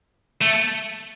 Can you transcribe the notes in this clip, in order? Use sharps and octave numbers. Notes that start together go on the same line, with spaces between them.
A3